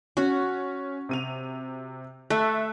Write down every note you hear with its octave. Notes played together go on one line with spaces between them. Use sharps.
C#4 F#4
C3 D#7 F7
A3 E5 E6 F#6